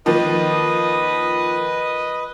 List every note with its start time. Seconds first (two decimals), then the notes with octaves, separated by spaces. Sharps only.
0.06 D#3 F3 A#3 B4 D#5